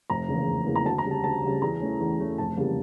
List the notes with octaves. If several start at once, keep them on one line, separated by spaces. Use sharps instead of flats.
F1 A#5
E2 C#3 E3 A#3
F1
E2 C#3 E3 A#3
A#5
D2 A5
A#5
C#3 G3
A5
D2 A5
C#3 G3
E2 A#5
E3 A3 C#4
E2
E3 A3 C#4
F1 A5
E2 C#3 G3 A#3